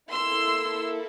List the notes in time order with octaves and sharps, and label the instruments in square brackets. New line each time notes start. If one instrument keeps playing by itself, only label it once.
[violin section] A#3 E4 A4 C6 E6